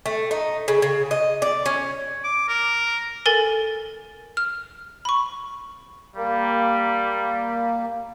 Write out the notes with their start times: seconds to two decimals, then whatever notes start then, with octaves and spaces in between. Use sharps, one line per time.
0.06 A3
0.31 D#4
0.68 C#3
0.82 C#3
1.11 D#5
1.42 D5
1.66 C#4
2.24 D6
2.48 A#4
3.26 A4 A#4 G#5 A6
4.37 F6
5.05 B5 C#6
6.16 G3 A#3